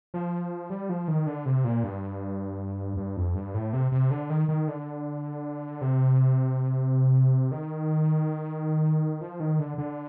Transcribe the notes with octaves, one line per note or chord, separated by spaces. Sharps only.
F3
G3
F3
D#3
D3
C3
A#2
G2
G2
F2
G2
A2
C3
C3
D3
D#3
D#3
D3
C3
D#3
F3
D#3
D3
D3